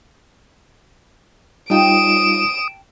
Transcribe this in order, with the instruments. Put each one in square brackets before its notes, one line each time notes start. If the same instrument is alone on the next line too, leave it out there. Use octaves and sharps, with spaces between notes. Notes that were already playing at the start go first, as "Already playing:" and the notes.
[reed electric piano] G3 D#4 F4 [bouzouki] G5 A5 [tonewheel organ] D#6 [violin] D7 E7